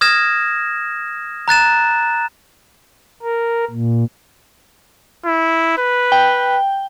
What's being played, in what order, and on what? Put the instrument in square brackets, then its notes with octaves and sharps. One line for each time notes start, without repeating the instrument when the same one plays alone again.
[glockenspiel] D#6 F6 G#6 A#6 E7
A#5 F#6 A6 E7
[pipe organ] A#4
A#2
[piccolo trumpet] E4
B4
[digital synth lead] G5